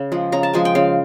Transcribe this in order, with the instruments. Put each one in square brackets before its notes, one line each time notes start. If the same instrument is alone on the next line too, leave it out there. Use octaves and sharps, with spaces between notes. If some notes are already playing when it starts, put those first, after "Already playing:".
Already playing: [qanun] C#3
F3 G#3
C#3 A#5
A5
F3 G#3 G#5
G5
C#3 F5